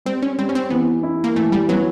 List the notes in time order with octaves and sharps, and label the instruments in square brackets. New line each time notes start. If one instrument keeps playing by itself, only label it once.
[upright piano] G3 [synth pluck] C4
[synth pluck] C#4
[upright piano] G3 [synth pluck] C4
[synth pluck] C#4
C4
[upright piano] E3 [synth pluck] B3
[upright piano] E4
[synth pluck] A#3
[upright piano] E3 [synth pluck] A3
[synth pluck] G3
[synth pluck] F#3 [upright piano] B3